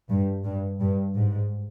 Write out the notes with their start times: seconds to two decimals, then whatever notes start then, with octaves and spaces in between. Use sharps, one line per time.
0.09 G2
0.44 G2
0.80 G2
1.15 G#2